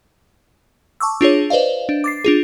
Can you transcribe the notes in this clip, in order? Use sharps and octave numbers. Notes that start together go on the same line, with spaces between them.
A5 C#6 D6 E6
D4 F4 G#4 C#5
B4 C5 D5 D#5 F5
D4
D6 A6 C7
D4 F4 G#4